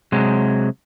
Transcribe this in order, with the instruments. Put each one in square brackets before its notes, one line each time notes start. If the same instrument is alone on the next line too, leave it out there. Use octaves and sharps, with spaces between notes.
[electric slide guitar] C3 F#3 G#3